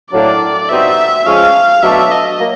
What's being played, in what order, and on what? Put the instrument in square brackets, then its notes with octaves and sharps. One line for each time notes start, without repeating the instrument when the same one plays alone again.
[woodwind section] A2 F#3 A#3 D4 [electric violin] D5
[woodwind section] B2 G3 C4 D#4 F#4 [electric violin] E5
[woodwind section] F3 G#3 C#4 [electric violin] F5
[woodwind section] B2 F#3 A3 D4 [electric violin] E5
[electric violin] D#5
[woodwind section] F#3 A#3